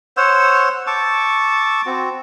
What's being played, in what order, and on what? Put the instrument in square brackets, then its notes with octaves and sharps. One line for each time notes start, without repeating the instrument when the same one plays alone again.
[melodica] C5 C#5 F#5 E6
A5 C#6 D6 E6
C4 F#4